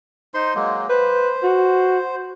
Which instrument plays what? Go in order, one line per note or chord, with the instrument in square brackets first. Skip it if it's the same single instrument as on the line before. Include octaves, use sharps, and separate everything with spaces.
[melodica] D#4 C5 C6
F#3 G#3 A#3
[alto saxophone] B4 [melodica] C5
[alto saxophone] F#4